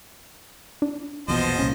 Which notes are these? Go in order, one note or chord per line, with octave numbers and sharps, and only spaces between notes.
D4
A#1 E2 B2 F3 C5 D#5
C2 A#2 C#4